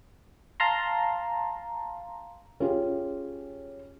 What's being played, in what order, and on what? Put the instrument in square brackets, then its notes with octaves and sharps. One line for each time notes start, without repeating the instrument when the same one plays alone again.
[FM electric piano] F5 A5 A#5 C6
[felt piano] C#4 F4 G4 G#4